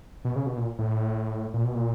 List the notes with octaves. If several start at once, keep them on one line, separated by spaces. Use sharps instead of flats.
B2
C#3
B2
A#2
A2
A#2
B2
A#2